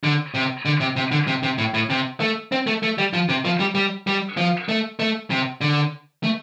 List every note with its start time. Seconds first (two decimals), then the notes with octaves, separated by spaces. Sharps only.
0.04 D3
0.34 C3
0.65 D3
0.80 C3
0.96 C3
1.11 D3
1.27 C3
1.43 C3
1.58 A2
1.74 A2
1.90 C3
2.20 A3
2.52 C4
2.67 A3
2.83 A3
2.98 G3
3.13 F3
3.29 C3
3.45 F3
3.60 G3
3.75 G3
4.07 G3
4.37 F3
4.69 A3
4.99 A3
5.31 C3
5.61 D3
6.23 A3